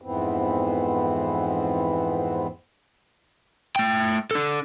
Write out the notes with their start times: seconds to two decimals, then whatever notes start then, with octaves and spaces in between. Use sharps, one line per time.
0.02 F2 G#2 E3 B3 C4
3.76 A3 G5
4.31 D4 A4